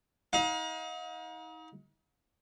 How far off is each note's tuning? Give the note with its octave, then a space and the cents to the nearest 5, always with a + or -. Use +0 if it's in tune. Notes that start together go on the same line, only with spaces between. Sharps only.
D#4 +35 F5 +45